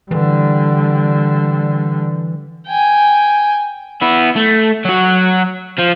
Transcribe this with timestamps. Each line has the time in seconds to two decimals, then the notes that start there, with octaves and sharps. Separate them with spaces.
0.11 D3 E3 G3
2.67 G5 G#5
4.01 B3 E4
4.36 A3
4.85 F#3 F#4
5.79 F3